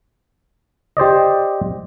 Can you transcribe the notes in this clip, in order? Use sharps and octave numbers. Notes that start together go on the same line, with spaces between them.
G4 C5 D5 D#5